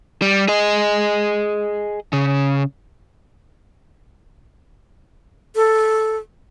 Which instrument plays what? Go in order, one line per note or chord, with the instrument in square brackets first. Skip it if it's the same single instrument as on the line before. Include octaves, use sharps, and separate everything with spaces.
[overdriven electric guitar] G3
G#4 D#5
C#3
[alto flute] A4